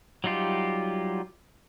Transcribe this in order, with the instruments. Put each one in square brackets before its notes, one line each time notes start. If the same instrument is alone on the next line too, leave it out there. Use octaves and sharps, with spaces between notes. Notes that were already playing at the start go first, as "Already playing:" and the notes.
[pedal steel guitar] F#3 G3 D#4 F4 G4